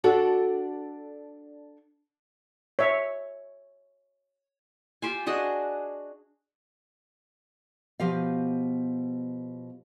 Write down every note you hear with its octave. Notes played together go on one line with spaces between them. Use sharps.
D4 F#4 A4
C#5 E5
F4 G4 C5 G#5
D4 F#4 G#4 D#5
B2 F3 G4 F5